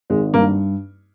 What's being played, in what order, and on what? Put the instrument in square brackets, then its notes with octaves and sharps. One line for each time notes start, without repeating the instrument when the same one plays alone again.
[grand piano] G#1 [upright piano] G#3
[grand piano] G2 [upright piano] A#3